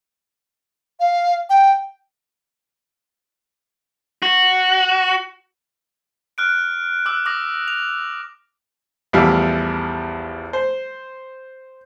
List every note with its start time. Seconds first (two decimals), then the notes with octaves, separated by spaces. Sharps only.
1.00 F5
1.50 G5
4.22 F#4
6.38 F6 F#6 D7
7.06 D6 E6 F#6
7.26 D6 D#6 A#6
7.68 F7
9.13 A1 E2 F3 G3 E5 F5
10.53 C5